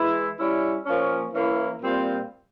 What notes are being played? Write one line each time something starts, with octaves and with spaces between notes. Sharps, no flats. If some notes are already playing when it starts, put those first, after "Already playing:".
Already playing: E3 G#3 E4
G3 C#4 E4
A#2 F3 A#3 C#4
E3 A#3 C#4 E4
A#2 G3 C4 F4